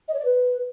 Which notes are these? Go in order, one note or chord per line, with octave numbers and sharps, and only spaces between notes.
D#5
C#5
D5
B4